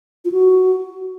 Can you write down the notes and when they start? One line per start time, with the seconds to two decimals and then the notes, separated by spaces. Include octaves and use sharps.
0.25 F4
0.32 F#4